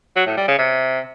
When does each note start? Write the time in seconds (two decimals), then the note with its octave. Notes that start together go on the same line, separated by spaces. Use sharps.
0.16 F#3
0.26 A2
0.37 G3
0.48 C#3
0.58 C3